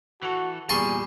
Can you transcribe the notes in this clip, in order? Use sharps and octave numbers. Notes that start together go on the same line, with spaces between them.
E3 F#4 A4
E2 A#2 G3 G#4 A5 C6 C#6 D#7